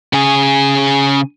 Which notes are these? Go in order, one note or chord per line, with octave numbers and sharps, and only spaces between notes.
C#3 G#4